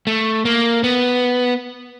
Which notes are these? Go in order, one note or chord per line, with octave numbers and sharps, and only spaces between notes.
A3
A#3
B3